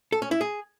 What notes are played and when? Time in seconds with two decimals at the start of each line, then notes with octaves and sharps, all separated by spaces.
0.12 A4
0.22 C#4
0.31 E4
0.41 G#4